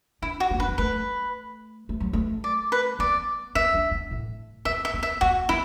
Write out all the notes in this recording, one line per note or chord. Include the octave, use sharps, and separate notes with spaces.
D4 E4
F#4
B3
D4 B4
B3
A3 B4
A3
F#3
A3
D5
B4
B3 D5
B3 E5
D4
B3
A2
B3 E5
E5
B3
E5
B3 F#4
B3 E4